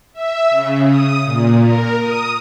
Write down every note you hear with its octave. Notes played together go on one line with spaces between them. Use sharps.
E5
C#3
D#6
A#2
A#4
D#6